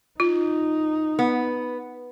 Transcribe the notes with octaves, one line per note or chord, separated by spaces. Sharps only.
D#4 F4
B3